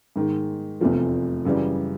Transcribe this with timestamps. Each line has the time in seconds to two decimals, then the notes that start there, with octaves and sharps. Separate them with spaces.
0.16 G#2 D#3 G#3
0.81 F1 E2 C3 F3 A3
1.45 F#2 C#3 E3 G3